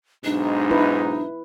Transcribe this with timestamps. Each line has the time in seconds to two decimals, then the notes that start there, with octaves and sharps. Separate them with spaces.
0.24 B1 G#2 D4 D#4
0.71 E4 B4